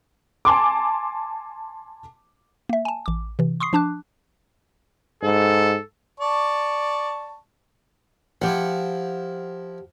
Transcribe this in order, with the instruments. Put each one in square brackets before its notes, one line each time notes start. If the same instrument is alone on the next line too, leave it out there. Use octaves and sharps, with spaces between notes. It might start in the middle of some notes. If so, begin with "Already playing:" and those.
[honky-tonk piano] G#5 A5 C6 D6
[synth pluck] A#3 E5
G#5 A5
A1 D6
C3 E3
C6 C#6 D#6 C7
F3 D4 A5 D6 F#6
[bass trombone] G#2 [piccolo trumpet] A4
[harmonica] D5 A5 C#6
[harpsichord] F3 E4 [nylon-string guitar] G4 F#5